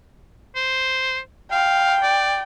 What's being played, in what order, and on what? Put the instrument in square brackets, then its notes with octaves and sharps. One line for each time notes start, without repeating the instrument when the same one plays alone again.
[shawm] C5
[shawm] F5 [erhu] G5
[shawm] D5